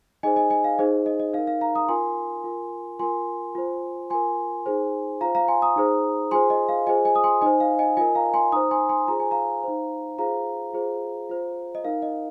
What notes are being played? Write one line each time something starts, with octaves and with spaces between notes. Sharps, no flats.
D#4 G#4 C5 D#5 G#5
D#5 G#5
D#5 G#5
F5
D#4 G#4 C5 D#5
D#5
D#5
D#4 A#4 F5
F5
F5 A#5
A#5 D#6
F4 A#4 G#5 C6
F4 A#4
F4 A#4 G#5 C6
F4 C5
F4 A#4 G#5 C6
D#4 G#4 C5
F4 C5 F5 A#5
F5 A#5
G#5 C6
A#5 D#6
D#4 G#4 C5
F4 G#4 C5 G#5 C6
D#5
F5
F4 G#4 C5 D#5 G#5
D#5 G#5
D#6
G#5 C6
D#4 C5 D#5 G#5
F5
D#5 G#5
F4 A#4 D#5 G#5
F5 A#5
G#5 C6
D#4 C5 A#5 D#6
G#5 C6
G#5 C6
F4 G#4 C5 A#5
G#5
F5 A#5
D#4 C5
F4 G#4 C5 F5 A#5
F4 G#4 C5
F4 C5
D#5
D#4 A#4 F5
D#5